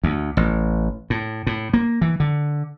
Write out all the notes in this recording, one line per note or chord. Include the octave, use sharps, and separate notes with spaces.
D2
A1
A2
A2
A#3
E3
D3